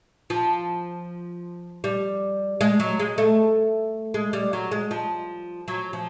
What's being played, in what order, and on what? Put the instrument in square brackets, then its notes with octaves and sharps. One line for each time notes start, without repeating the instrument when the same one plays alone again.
[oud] F3
G3
G#3
F#3
G#3
A3
G#3
G3
F#3
G#3
F3
F#3
F3